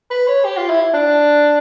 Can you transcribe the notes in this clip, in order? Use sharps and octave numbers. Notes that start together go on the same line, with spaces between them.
B4
C#5
G4
F4
E4
D4